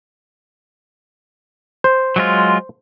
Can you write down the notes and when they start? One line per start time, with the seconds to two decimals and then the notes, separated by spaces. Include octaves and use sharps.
1.84 C5
2.16 F#3 G#3 F4